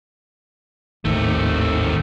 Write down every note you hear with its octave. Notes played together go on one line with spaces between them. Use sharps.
G#1 D#2 A2 A3 C4